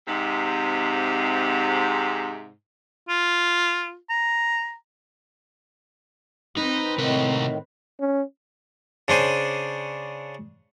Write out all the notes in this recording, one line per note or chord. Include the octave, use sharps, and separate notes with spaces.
G#2 C3
F4
A#5
C4 D#4 B4
A2 C3 D#3 A#4
C#4
C#3 D4 C5 G#5